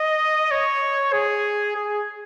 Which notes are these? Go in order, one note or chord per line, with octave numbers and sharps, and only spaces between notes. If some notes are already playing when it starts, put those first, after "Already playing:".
Already playing: D#5
C#5
G#4
G#4